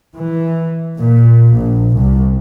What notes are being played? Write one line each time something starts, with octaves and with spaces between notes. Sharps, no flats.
E3
A#2
A#1
C2